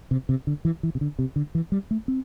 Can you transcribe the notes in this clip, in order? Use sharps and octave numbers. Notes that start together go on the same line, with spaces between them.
C3
C3
D3
E3
E3
C3
D3
C3
D3
E3
G3
A3
C4